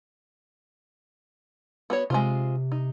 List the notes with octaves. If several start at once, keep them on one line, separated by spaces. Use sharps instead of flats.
B3 F#4 C#5
C3 G#3 C4 F4
D#4